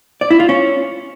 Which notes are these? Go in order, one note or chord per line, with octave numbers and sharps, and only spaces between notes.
D5
E4
F4
C#4